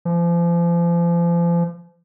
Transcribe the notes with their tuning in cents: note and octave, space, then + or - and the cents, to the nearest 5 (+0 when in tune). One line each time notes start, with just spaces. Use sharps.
F3 -35